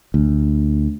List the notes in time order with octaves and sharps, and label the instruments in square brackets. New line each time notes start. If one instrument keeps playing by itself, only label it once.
[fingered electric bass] D2